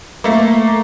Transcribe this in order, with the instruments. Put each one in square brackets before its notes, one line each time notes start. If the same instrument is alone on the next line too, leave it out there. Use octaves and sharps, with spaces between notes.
[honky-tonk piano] A3 A#3